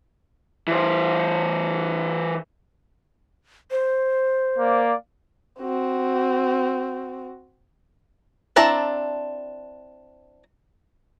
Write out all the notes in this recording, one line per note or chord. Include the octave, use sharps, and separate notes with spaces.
E3 C5
C5
A#3 D5 F5
C4 F#4
C4 D4 E4 A5 A#5